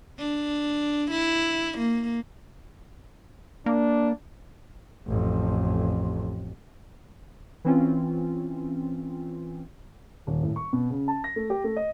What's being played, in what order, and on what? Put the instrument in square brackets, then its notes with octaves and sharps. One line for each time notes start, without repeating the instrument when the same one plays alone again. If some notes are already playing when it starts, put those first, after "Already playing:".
[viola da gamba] D4
E4
A#3
[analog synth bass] A#3 [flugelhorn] D4
[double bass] A1 F2
[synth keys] E3 C4 C#4 F4
[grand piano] D#1
A2
C#6
B2
C#3
A5
A#6
A3
G4
A3
D#5